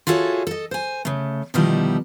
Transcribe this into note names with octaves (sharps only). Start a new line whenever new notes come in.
F4 F#4 G#4 A4 C#5 E5
A4 D#5
C5 G#5
C#3 A3
B2 D3 D#3 F3 G3 E4